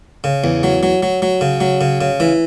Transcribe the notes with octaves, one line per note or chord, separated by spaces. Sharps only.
C#3
E2
F#3
F#3
F#3
F#3
C#3
F#3
C#3
C#3
E3